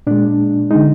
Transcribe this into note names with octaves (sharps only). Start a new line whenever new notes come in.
A#2 G#3 D4
D3 G#3 D#4